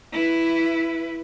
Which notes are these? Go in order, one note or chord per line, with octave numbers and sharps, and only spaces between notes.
E4 B4